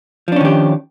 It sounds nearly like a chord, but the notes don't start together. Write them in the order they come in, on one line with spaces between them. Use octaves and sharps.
F3 D4 C#4 D#3 G4